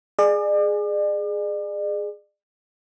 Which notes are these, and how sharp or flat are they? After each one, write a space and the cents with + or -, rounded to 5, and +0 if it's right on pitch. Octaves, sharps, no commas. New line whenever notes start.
G#4 +0 D5 +40